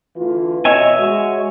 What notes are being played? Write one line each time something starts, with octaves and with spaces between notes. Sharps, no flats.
D2 E3 F4
B2 C#5 D#5 E5 G#5
G#3 F#4